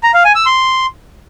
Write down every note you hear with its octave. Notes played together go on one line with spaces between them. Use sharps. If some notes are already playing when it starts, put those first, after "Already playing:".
A#5
F5
G#5
E6
C6